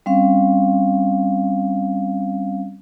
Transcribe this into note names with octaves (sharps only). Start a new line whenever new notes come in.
G3 C4 C#4 F5